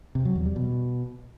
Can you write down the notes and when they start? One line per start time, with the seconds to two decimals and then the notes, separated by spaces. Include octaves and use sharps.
0.15 C3
0.25 F#3
0.36 E2
0.46 G3
0.56 B2